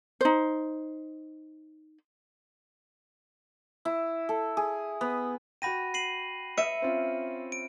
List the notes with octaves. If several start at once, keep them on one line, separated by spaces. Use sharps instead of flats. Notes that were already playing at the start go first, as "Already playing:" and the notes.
D#4 C5
E4
A4
G#4
B3
F#4 F#5 G5 B5 A#6 D#7
C7 D#7 F#7
E5 C#7 D#7
C4 C#4 F4
D7